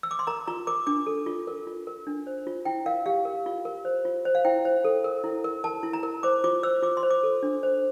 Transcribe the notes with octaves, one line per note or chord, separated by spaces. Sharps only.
E6
D6
C6
A#4 A#5
F4 A#5
A#4 D6
D4 D6
A4
F4
A#4
F4
A#4
D4
C5
F4
E4 G5
A#4 F5
G4 F5
A#4
F4
A#4
C5
F4
C5
F5
E4 G5
C5
A4
A#4
E4
A#4
A#4 A5
E4
A#5
A#4
C5 D6
F4 D6
C5 E6
F4 D6
C6
C5
D6
A4
D4
C5